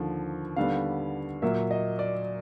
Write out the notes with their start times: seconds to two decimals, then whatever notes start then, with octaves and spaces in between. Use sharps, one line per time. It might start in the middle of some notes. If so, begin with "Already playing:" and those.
Already playing: D#2 D3 F3
0.56 D#2 D3 G3 B3 F5
1.42 A#2 F#3 A#3 E5
1.71 D#5
1.99 D5